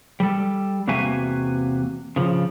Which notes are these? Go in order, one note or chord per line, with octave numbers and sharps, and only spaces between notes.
G3 A4
E2 C3 A#3 F#4 E5 G#5
C#3 F3